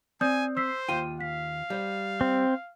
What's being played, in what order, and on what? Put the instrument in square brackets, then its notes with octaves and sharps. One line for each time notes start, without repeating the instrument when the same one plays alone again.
[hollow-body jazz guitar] C4 [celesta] D5 D#6 G6 [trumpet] G#5
[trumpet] C5 [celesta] E6 B6 C7
[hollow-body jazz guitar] D#2 F4 G5 [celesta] D#7
[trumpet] F5 [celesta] B6
[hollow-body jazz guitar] G3 C5
[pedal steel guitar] C4